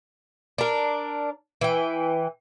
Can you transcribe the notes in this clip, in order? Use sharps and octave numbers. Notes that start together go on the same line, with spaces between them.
D4 A#4
E3 G5